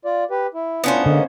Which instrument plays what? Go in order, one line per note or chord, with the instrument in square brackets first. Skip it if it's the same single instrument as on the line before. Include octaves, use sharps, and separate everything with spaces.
[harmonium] F4 D5
G4 B4
E4
[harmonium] A2 D4 F4 [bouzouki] B3 C#4 C5
[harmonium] G#2 A#3 D#5 [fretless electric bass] D3